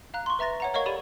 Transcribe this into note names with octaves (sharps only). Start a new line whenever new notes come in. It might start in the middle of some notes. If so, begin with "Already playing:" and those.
F5 A#5 F#6
C6 C#6
B4 E5 A#5 A6 A#6
C#5 F#5 A#5
A#4 C#5 D#5 F5 C#6 G#6
G4 A4 D5 B5 D#7